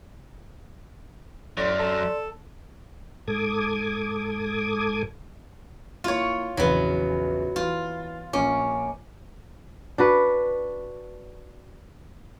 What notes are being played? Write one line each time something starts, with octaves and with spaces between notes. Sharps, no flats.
F#2 A2 D5 C6
A4
G#2 A4 D6 D#6 G#6
A#3 E4 F4 C#5
A#1 E2 C#3 F#3 B3
E3 F4
A#1 A#3 C#4 D6
D4 F#4 B4